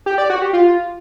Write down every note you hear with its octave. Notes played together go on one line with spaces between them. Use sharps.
G4
D5
F#4
G4
F4